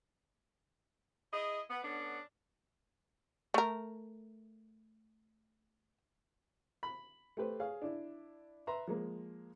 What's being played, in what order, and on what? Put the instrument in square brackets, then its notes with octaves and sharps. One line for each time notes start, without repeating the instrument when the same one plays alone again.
[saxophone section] E4 G#4 D#5
B3
D3 B3 C#4 D4
[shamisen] A3 A#4
[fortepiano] B5
A3 G4 B4 C5
G#4 C#5 F5
D4 E4
B4 E5 A#5 C6
F3 G#3 A#3